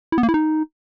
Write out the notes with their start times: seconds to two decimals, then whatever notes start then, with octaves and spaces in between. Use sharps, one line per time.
0.12 E4
0.18 B3
0.23 A#3
0.29 E4
0.34 D#4